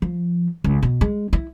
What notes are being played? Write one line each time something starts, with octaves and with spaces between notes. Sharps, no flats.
F3
C#2
B2
G#3
E4